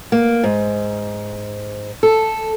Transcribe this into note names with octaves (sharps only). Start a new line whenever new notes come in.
A#3
G#2
A4